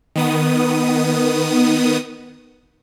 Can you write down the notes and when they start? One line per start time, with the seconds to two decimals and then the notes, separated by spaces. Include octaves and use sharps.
0.16 D#3 B3 D#6